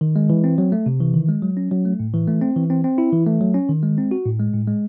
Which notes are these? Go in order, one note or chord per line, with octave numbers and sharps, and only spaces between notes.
D#3
G#3
E3
C4
F#3
A3
C3
E3
D#3
G#3
F#3
C#4
F#3
A3
A2
E3
A3
C4
E3
C4
C4
E4
E3
A3
F#3
C#4
D#3
G#3
C4
F#4
A2
G#3
A2
G#3